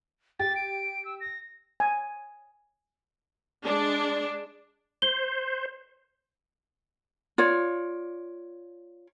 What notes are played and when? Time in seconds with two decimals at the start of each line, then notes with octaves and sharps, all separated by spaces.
0.39 G4 A6
0.56 D7
1.05 E6
1.20 A#6
1.80 G#5
3.65 G#3 D4
5.02 C5 G7
7.38 F4 C#5 D5